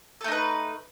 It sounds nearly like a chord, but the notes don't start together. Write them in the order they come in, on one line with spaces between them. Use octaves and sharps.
A4 A3 D#4 B4